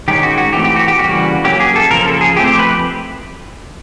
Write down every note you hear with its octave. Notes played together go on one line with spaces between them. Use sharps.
D#3 G#3 C#4 G4
F#4
F#4
E3 A3 C4 G4
G4
F#4
G4
C#3 E3 G3 A#3 F#4
F#3 A#3 C#4 G4
G#4
A4
C#3 F3 A#3 A#4
A4
G#4
F3 A3 C4 G4
G4
B4